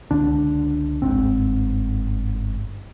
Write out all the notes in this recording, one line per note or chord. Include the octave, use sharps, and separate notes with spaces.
C#2 D3 D4
G1 G#2 C4